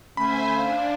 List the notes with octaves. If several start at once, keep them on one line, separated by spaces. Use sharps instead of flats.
D3 A3 C#4 C5 E5 G#5 B5
D4 F5